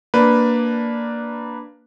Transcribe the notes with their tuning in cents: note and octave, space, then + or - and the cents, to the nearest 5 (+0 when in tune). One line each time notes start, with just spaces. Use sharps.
A#3 +0 D4 +0 B4 +0